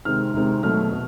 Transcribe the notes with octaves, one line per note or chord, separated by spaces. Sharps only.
C3 D#3 G#3 C4 F6
C3 D#3 G#3 C4
B2 F#3 A3 F6
B2